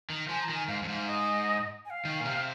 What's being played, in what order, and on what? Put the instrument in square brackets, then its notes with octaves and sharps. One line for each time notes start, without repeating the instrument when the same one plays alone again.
[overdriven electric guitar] D#3
[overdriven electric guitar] F3 [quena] G#5
[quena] A#5
[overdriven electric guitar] D#3
[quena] G#5
[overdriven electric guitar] G#2 [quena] F5
[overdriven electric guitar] F2
G#2
[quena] F5
D#5
G#5
F5
[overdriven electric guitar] D#3
A#2
C3